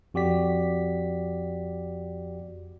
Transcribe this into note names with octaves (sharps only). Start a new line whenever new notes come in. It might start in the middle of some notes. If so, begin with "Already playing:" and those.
F2 F#4 G4 D5 B6